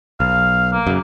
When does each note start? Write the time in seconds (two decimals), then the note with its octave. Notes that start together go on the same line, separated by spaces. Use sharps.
0.20 B1 F5
0.73 A#3
0.87 F#2 C#3